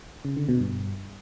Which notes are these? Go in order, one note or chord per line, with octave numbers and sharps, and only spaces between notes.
C#3
D3
B2
G2